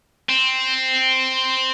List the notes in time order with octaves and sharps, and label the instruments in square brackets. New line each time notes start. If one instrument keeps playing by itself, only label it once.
[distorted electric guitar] C4